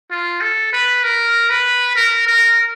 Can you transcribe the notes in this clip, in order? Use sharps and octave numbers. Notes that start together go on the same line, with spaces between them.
F4
A4
B4
A#4
B4
A#4
A#4